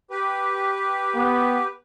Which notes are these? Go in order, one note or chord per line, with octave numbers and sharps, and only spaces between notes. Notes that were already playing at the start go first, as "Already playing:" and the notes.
G4 B4
B3